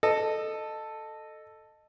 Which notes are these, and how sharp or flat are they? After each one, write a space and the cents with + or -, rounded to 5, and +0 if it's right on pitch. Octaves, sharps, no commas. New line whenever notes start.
A4 +0 D#5 -15